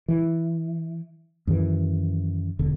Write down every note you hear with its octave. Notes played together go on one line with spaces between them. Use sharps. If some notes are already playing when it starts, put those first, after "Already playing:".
E3
F#2 D#3 E3
E1 D3